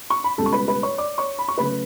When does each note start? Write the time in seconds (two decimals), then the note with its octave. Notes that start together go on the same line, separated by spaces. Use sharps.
0.10 C#6
0.24 B5
0.38 C#2 B2 G3 A4 A5
0.46 C#6
0.52 B4 B5
0.68 B4 B5
0.83 C#5 C#6
0.98 D5 D6
1.18 C#5 C#6
1.39 B5
1.48 C#6
1.58 C#3 F#3 A3 B4 B5